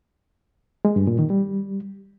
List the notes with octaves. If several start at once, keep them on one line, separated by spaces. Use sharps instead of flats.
G#3
G2
A#2
D#3
G3